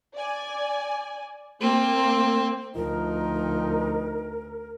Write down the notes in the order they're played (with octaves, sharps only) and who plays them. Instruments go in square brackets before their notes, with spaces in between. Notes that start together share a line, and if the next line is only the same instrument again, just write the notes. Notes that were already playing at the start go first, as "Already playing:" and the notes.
[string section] D5 G#5
[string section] A#3 [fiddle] C4
[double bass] D2 [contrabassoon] F3 [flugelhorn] D#4 [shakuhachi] A#4